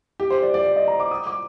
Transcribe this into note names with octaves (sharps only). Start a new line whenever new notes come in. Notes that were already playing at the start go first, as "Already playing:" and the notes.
G4
C5
D5
D5
D5
D#5
A#5
D6
D#6
D6